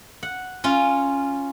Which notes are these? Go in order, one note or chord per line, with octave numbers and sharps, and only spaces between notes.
F#5
C#4 F4